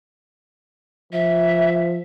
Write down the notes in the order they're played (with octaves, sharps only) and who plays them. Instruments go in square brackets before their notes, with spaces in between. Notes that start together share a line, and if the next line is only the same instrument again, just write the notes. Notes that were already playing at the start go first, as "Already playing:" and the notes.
[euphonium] F3 [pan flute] E5